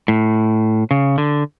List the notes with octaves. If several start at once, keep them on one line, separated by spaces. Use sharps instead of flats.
A2
C#3
D3